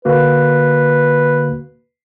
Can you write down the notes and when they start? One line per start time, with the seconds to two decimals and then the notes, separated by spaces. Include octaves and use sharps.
0.05 D3 A#3 F#4 B4